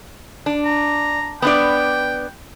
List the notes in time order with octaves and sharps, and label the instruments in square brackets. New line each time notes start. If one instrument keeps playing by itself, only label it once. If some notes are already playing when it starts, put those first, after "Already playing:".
[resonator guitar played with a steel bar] D4
[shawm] A#5
[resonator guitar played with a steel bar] B3 D4 D5 [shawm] G5